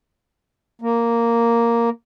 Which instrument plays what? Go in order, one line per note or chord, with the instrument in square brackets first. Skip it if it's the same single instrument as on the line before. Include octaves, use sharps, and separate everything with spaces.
[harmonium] A#3